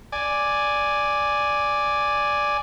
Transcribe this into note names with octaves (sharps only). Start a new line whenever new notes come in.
D5 G#5